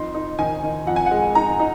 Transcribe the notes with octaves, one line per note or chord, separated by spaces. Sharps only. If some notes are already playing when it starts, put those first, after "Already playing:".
Already playing: F2 D#4 C6
D#4
D#3 G#5
D#3
F2 F#5
G#5
F#5
G#3
D#4 A#5
D#4